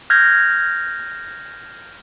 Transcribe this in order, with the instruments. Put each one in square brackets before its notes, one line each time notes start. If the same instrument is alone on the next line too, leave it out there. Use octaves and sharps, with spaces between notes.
[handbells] F6 G6 G#6 A#6